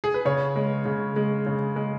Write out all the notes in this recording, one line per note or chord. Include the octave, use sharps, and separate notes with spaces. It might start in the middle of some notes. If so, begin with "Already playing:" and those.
G#4
B4
C#3 C#5
G#3
C#3
G#3
C#3
G#3